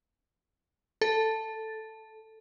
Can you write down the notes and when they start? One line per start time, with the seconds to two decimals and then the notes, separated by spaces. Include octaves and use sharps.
1.01 A4